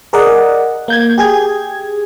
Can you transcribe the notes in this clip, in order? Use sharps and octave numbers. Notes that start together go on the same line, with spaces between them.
G#4 A#4 D5 D#5 F#5
A#3 G6 G#6
G4 G#4 G#6